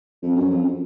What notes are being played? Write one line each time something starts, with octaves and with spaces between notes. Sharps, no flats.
F2
F#2
F2